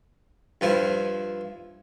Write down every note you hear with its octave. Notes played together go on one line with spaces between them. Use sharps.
G2 F3 E4